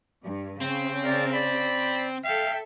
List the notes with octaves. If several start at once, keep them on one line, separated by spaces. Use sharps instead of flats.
G2
C#3 C4
A#4 D5
D5 B5
A4 E5 F5 G5